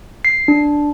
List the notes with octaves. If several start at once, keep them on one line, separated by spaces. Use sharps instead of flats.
C7
D4